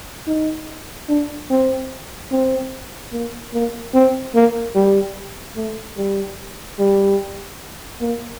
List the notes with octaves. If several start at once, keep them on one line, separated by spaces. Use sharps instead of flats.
D#4
D4
C4
C4
A#3
A#3
C4
A#3
G3
A3
G3
G3
A#3